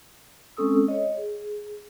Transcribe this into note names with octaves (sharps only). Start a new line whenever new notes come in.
G#3 C4 C#4 A4 D#6 E6
C#5 D#5
G#4